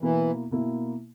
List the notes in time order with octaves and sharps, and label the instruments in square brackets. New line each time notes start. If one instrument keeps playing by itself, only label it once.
[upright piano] B2 A#3 E4 [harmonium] E3
[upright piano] B2 A#3 E4